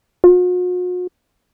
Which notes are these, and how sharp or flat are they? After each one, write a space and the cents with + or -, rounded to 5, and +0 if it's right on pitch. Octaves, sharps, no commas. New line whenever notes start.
F#4 -45